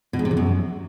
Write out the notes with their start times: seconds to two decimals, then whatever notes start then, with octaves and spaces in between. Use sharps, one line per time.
0.13 B2
0.19 G#2
0.25 C3
0.31 E2
0.37 F#2